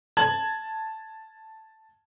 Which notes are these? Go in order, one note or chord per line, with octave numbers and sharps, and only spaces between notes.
A5 G#6 F#7